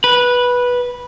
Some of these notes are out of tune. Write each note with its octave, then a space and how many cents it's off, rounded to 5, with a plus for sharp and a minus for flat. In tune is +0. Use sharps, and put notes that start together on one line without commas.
B4 -10